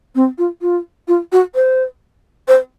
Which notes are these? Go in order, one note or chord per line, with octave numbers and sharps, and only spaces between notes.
C4
F4
F4
F4
F#4
C5
C5